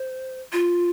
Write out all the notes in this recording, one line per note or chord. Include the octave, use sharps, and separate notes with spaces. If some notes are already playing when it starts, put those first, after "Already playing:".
Already playing: C5
F4